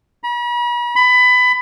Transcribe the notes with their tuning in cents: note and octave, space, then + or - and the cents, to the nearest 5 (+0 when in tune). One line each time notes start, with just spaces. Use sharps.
B5 -45
B5 +20